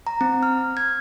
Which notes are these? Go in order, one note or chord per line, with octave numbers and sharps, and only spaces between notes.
A#5
C4
F6
G#6